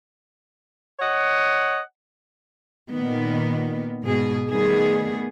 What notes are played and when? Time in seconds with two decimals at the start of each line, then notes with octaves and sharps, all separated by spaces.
1.00 C#5 D#5 F#5
2.90 A#2 D#3 B3
4.04 G#2 B2 G#4
4.50 D#3 G3 A3 B3 G#4